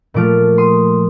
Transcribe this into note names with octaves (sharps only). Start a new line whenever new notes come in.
A#2 F3 A3 D6 F6
C6 D#6